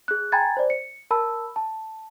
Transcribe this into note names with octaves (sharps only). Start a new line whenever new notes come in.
G#4 F#6
G5 G#5 A#5 B5 G#6 A6
C5 D5
C#7
A#4 A5 B5 E6
A5